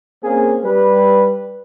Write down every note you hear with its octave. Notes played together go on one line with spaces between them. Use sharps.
A#3 C4 C#4 G#4
G3 B4